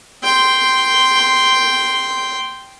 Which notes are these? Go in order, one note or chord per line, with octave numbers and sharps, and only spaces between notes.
G5 C6